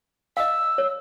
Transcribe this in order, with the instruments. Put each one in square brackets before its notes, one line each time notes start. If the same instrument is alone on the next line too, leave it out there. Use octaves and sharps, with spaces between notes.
[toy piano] D#5 F5 [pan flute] E6
[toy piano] C#5